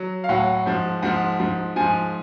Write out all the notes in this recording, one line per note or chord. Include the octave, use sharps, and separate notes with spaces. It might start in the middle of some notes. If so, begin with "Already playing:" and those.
Already playing: F#3
F5
A2 F#3 F#5
G#2 F3
G#2 F3 F#5
G#2 F3
G#2 F3 G#5